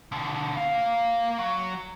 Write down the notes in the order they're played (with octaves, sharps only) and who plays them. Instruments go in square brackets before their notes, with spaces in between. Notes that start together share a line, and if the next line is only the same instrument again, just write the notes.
[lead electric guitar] B2 D3
A#3 F5
F#3